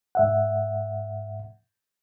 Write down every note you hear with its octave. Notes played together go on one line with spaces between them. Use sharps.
G#2 E5 F#5